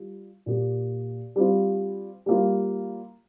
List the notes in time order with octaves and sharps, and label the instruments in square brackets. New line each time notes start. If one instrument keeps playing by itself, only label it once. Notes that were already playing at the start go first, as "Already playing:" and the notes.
Already playing: [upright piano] G3 F4
A#2 A#3 G4
G3 C4 F4
G3 A#3 F4